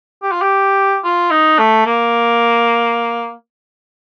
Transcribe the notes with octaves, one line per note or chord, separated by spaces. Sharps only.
G4
F4
G4
F4
D#4
A3
A#3